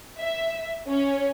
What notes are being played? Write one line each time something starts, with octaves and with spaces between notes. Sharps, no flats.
E5
C#4